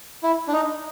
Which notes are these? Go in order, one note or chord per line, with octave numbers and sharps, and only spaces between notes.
E4
D4
D#4